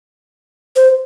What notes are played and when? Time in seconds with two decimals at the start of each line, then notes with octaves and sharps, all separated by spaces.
0.76 C5